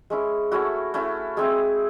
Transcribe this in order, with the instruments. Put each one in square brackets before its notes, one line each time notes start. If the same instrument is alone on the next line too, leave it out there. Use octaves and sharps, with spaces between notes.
[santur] G#3 C#4 E4
A3 C#4 E4 F#4
A3 C#4 E4
G#3 C4 E4 G#4